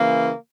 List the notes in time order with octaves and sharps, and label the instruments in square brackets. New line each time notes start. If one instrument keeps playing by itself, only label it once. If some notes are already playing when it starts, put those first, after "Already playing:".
Already playing: [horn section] C#3 E3 A#3